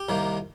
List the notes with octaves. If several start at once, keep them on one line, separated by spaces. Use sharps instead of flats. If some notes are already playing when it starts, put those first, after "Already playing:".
Already playing: G4
C2 C3 D#3 A#3